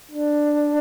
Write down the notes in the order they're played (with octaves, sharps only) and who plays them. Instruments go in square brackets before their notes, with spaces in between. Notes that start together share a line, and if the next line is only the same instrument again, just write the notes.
[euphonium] D4